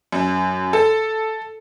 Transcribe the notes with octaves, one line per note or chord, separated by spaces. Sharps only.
F#2
A4